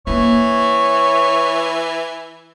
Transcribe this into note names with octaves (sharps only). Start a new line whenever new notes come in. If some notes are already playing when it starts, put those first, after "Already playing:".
E3 A#3 C#4 C#5